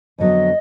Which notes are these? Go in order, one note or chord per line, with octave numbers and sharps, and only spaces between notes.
F2 D3 F#3 B3 D#5